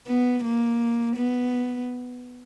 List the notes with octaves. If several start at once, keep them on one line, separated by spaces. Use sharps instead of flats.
B3
A#3
B3